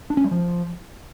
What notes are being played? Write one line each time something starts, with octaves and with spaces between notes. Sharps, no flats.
D4
C#4
G3
F3